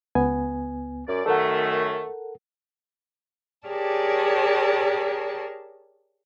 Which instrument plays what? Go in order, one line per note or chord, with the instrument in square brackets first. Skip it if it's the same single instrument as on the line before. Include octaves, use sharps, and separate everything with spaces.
[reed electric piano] C#2 B3 G#5
[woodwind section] F#2 D5
[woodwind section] F#2 D#3 A3 [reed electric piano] A4 A#4 F#5
[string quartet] G4 G#4 A#4 C#5 D5 A5